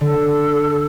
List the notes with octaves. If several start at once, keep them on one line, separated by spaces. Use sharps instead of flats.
D3 A4